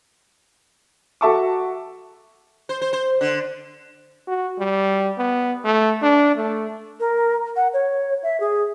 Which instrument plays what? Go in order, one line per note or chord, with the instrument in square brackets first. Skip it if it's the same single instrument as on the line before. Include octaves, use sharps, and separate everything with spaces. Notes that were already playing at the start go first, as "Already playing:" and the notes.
[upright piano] F#4 A4 E5 A5 C#6 D6
[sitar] C5
C5
C5
D3
[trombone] F#4
G3
B3
A3
D4
A3
[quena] A#4
F#5
C#5
E5
G#4